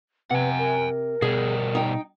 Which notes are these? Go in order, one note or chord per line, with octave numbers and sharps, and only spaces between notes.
C3 B4 F#5 G#5
A#4
B2 G3 G#4
D#4 G5